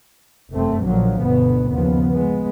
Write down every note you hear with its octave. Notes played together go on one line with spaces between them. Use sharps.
F1 F#2 C3 A3 C4
A#1 A#2 D3 F3 F#3
G1 D2 B2 B3
D#2 C#3 F3 B3
G#3 B3